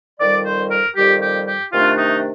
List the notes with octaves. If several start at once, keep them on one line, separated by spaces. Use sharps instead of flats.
F2 D#3 G3 D5
C5
A#4
F2 D#3 G3 G4
G4
G4
C3 D#3 A3 D4 F4
D#4